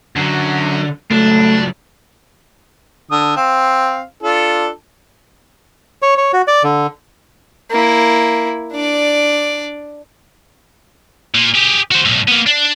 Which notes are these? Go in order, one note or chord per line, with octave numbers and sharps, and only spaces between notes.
F#2 D3 F#3
C#2 F#3 A3 D4
D3 D#6
C4 F5
D4 F4 A4
C#5
C#5
F#4
D5
D3
A#3 E4
D4 D5
A#2
G4 G#4
F#4 C5
B1 A2
A#3 B3
D4